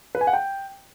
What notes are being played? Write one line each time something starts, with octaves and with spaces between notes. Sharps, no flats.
B4
G#5
F#5
G5